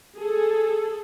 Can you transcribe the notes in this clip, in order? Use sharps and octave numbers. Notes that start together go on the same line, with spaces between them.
G#4 A4